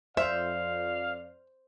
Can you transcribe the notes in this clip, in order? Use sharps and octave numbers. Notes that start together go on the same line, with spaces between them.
F2 C5 D5 E5 F5